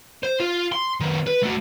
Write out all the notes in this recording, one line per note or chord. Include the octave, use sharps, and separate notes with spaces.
C5
F4
C6
D#3 B3
B4
A3 F#4